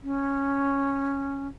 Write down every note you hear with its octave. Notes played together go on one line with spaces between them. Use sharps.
C#4